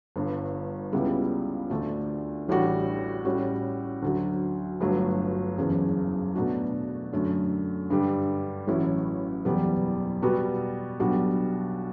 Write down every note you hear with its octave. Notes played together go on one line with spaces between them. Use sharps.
G1 G2 D3
C#2 C#3 G3 B3 E4
D2 D3 A3 D4
A1 A2 G3 D4 F#4
A2 G3 C#4 F#4
D2 D3 F#3
G1 G2 F#3 A3
F#1 E2 C#3
B2 F#3 A3 D4 F#4
F#2 D3 A3
G2 D3 G3
A1 A2 F#3 C#4 E4
F#1 E2 B2 G3 B3
B2 G3 B3 F#4
B1 B2 G3 D4 F#4